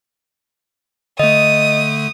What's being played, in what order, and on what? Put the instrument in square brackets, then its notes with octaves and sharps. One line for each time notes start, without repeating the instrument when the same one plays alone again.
[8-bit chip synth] D3 A3 [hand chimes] D#5 [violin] D#6